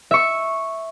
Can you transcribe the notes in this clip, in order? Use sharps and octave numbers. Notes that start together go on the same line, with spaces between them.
E5 C#6